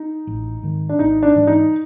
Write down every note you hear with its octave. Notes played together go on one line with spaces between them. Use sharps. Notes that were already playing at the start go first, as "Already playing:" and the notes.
Already playing: D#4
A1
G#2 D#3
D4
G#1 D#4
D4
G#2 E3
D#4